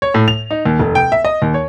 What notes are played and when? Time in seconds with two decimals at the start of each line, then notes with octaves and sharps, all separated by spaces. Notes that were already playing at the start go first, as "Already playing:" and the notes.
0.02 C#5
0.14 A2
0.28 F7
0.51 D#4
0.66 D#2
0.79 F1
0.95 G5
1.12 E5
1.25 D#5
1.42 D#2
1.54 C#5